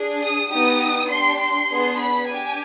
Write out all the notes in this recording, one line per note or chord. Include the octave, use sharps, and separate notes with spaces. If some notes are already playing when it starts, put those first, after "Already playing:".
Already playing: D4 G#4
D#6
B3 D#4 G4 D#6
D4 G4 C6
C6
B3 D4 G#4
B5
D4 G4 G#5